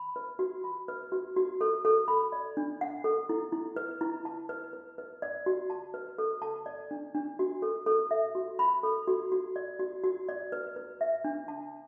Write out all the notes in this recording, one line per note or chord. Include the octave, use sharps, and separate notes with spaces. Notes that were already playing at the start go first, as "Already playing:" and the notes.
Already playing: B5
B4
F#4
B5
B4
F#4
F#4
A4
A4
B5
D5
D4
F#5
A4
E4
E4
B4
E4
A5
B4
B4
B4
D5
F#4
A5
B4
A4
A5
D5
D4
D4
F#4
A4
A4
E5
F#4
B5
A4
F#4
F#4
D5
F#4
F#4
D5
B4
B4
E5
D4
A5